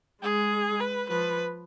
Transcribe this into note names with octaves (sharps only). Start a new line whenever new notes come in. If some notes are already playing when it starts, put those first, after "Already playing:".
G#3 G#4
B4
F3 B4